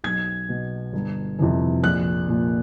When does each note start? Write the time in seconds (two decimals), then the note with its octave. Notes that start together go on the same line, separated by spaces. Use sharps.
0.04 B1 G#6
0.49 B2
0.93 G1
1.39 F2 C3 E3
1.83 A#1 F#6
2.28 A#2 F3